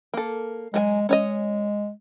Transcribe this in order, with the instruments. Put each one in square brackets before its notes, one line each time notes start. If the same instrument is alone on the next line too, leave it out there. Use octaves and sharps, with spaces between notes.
[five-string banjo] A#3 A4
[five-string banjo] F#3 A4 G#5 [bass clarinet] G#3
[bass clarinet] G#3 [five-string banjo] C#4 C#5 D#5